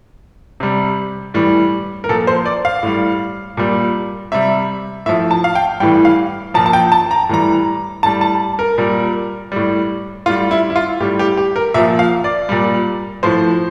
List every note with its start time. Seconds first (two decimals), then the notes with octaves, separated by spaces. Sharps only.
0.60 C3 G3
1.34 A2 E3 G3
2.04 A#4
2.09 A#2 F3 A4
2.27 C5
2.46 D5
2.65 F5
2.83 A2 G3
3.57 A#2 G3
4.32 C3 G3 E5
5.06 A2 E5
5.09 F3
5.31 A5
5.44 F5
5.55 G5
5.80 A2 E3 G3 G5
6.05 F5
6.54 A#2 F3 A5
6.66 A5
6.73 G5
6.92 A5
7.11 A#5
7.29 A2 E3 G3 A#5
8.03 A2 G3 A5
8.21 A5
8.59 A#4
8.78 A#2 G3
9.52 A2 G3
10.26 A2 F4
10.30 G3
10.51 E4
10.70 E4
10.76 F4
11.00 A2 G3 G4
11.19 G4
11.37 G4
11.56 A#4
11.74 A#2 F3 E5
11.99 F5
12.24 D5
12.49 A#2 G3
13.23 A2 F3 C5